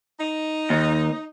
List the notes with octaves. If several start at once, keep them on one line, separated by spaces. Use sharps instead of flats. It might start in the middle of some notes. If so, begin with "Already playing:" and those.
D#4
D#2